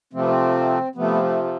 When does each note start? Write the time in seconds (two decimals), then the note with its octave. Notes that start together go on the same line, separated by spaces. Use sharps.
0.13 C3 F3 A3 C4
0.21 B3
0.28 C4
0.95 C3 F3 A3 B3
1.22 A3
1.43 A3